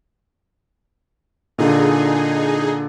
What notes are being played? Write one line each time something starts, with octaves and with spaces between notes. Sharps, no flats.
A#2 D3 D#4 G#4